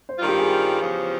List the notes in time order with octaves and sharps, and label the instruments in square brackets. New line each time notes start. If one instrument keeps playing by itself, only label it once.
[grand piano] C5
[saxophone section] G2 D#3 G3 C4 F4
[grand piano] G4
G#4
[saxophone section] E2 C#3 F3